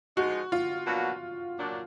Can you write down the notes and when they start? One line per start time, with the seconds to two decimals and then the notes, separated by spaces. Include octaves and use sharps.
0.17 F3 G#3 D#4 F#4
0.52 F4
0.86 B2 F#3 A#3 D4 F#4
1.57 A#2 F#3 D4